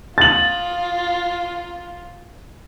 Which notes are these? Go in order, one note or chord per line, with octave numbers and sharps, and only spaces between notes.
F4 A6 F#7